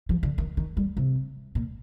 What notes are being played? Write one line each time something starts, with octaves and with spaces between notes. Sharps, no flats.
F3
D3
D#3
D#3
G3
C3
A#2